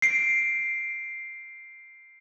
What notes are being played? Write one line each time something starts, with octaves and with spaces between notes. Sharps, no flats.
C7 D7